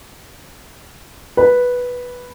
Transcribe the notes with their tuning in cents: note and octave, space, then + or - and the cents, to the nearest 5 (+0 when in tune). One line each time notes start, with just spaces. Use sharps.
B4 -5